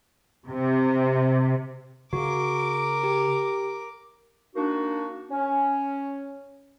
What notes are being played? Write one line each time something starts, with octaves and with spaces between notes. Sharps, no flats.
C3
C#3 F#4 A#4 D6
G4
A#3 D4 D#4 F#4
C#4